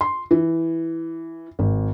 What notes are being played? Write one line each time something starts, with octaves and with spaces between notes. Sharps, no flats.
C6
E3
G#1